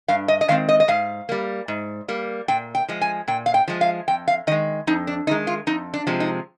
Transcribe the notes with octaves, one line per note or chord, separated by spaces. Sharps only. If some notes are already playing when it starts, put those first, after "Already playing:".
G2 F5
D#5
D#5
D#3 G#3 C4 F5
D#5
D#5
G#2 F5
G3 A#3
G#2
G3 A#3
A#2 G5
G5
F3 G#3
G#5
A#2 G5
F5
G5
F3 G#3
F5
F2 G5
F5
D#3 G#3 D#5
F2 D#4
D4
D#3 G#3 D#4
F4
F2 D#4
D4
C3 F3 G#3
D#4